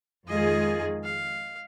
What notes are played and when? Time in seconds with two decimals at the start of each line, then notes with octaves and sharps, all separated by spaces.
0.28 F2 D#3 G#3 F4 G#4 D#5
1.04 F5